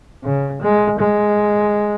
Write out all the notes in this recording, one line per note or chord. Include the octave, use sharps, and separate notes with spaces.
C#3
G#3
G#3